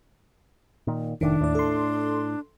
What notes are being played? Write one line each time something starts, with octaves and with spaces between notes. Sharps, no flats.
A#2 D#3
F1 A2 D#3 D4
D#2 A2 D5
A4 C6